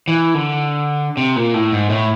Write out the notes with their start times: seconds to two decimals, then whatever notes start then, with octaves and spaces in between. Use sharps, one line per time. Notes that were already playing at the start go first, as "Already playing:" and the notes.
0.08 E3
0.34 D3
1.17 C3
1.36 A#2
1.54 A2
1.72 G#2
1.90 A2